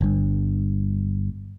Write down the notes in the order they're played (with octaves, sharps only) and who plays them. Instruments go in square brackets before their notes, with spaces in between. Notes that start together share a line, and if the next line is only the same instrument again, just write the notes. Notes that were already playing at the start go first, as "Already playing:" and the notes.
[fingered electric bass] G1 G2